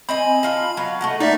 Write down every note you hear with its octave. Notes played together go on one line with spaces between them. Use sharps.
C4 D#5 G#5 B5
D#4 F4 A5
F#3 B3 F5
A3 D#5 F#5
A#3 D#4 D5 E5